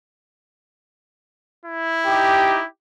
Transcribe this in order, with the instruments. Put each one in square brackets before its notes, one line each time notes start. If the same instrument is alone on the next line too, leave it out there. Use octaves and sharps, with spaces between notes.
[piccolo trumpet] E4
[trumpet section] D#4 G4